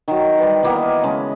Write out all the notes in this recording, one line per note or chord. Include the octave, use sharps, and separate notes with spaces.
D#3 F#3
G3 B4
D#3 E3 A#3 B3
G#5
C#3 G#3 A5